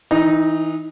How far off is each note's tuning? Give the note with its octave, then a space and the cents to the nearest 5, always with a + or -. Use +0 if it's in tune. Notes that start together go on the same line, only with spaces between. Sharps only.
E3 -25 D#4 +0